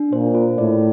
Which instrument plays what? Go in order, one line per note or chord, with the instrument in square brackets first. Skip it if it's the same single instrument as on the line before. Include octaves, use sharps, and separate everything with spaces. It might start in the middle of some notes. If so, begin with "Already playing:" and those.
Already playing: [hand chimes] D4
[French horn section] A#2 [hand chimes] C5
[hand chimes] F4
[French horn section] A2 [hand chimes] D5